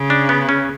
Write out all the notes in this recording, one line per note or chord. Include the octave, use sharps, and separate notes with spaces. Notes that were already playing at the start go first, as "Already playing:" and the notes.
Already playing: C#3
D4
B3
C#4